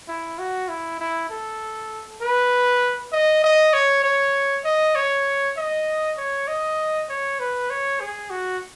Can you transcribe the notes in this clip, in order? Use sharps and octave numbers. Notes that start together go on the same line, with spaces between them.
E4
F#4
E4
E4
A4
B4
D#5
D#5
C#5
C#5
D#5
C#5
D#5
C#5
D#5
C#5
B4
C#5
G#4
F#4